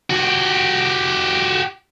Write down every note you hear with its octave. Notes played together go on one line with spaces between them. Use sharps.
F#4 G4